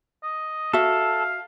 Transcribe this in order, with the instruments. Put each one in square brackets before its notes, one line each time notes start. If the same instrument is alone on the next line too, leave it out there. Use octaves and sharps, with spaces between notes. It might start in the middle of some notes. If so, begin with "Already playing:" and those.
[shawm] D#5
[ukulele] F#4 E5 [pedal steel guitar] A4 [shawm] F5